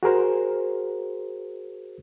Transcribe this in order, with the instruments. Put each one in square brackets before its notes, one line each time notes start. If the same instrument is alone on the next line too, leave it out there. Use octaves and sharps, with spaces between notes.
[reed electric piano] F#4 G#4 A#4 C5